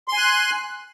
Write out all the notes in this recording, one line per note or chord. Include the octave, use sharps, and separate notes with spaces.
G#5 C6 F#6